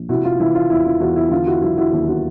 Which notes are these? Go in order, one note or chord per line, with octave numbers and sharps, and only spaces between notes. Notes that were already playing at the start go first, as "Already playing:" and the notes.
Already playing: A#1
C3 E4 F#4
F4
E3 E4
F4
E2 E4
F4
E2 E4 F#4
E4
D3 F4
E4 F#4
F#3 E4 F#4
E4 F#4
D#2
E4 F#4